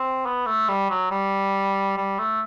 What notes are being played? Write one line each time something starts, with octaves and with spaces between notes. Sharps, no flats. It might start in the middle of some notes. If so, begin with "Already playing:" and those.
Already playing: C4
B3
A3
G3
F#3
G3
G3
A3